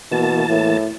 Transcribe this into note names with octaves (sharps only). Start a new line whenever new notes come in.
B2 E3 A#3 A5
A2